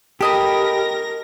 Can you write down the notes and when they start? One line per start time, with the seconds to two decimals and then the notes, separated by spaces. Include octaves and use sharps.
0.21 G4 A4 A#4 D#5 B5 A#6